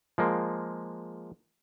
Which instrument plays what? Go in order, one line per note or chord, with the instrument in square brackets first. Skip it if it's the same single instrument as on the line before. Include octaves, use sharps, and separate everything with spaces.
[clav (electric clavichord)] F3 G#3 A#3